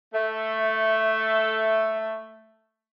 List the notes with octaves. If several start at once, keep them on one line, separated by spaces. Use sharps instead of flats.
A3 E5